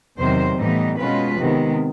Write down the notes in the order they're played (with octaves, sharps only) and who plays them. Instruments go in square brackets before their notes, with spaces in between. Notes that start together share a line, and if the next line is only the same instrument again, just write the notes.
[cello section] E2 C3 D#3 F#3 C5
A2 E3 G3 B3 D#4
B2 G#3 C#4 F4 B4
C3 D#3 G#3 B3